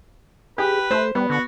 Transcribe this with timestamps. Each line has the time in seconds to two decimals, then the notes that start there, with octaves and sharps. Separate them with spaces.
0.58 G4 G#4 B4
0.91 A3 C5
1.15 G3 B3
1.30 D3 F#4